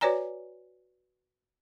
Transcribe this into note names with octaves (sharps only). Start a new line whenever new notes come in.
F#4 B4 C#5 D5 G#5 A#5